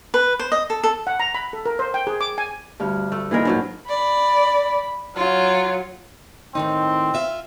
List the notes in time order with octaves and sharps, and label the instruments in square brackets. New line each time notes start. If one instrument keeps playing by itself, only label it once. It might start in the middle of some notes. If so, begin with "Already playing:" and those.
[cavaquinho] B4
C5
D#5
A4
A4
[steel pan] F#5
A#5
B5
A4
A#4
C5
G5
G#4
D6
G#5
[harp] D2 G2 F6
[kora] A3
[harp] A#2 D#4 B5 [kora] E3 G#4 A#4
[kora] G#2 F#3 D4
[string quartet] D5 [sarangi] B5
[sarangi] F#3 [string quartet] F4
[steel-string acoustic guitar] A2 D#3 D#4 [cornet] C4
[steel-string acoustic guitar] F4 E5 F5